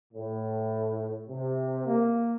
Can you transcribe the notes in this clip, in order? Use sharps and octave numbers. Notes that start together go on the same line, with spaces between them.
A2
C3
A#3